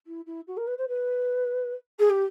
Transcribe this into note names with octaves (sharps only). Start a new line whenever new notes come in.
E4
E4
F#4
A#4
B4
C5
B4
G#4
G4